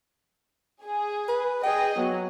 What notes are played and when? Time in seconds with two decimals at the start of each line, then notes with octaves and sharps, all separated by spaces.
0.84 G#4
1.29 B4
1.63 G#4 D#5 G5
1.98 F#3 B3